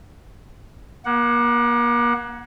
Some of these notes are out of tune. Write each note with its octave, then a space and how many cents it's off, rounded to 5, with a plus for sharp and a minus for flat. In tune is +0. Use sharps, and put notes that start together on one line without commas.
A#3 +35 F#5 +0